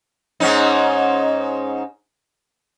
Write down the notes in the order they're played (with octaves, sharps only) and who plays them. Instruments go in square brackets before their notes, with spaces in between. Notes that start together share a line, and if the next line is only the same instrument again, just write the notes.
[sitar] G#2 C#4 D#4